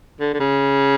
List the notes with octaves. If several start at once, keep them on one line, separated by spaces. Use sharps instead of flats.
D3
D3
C#3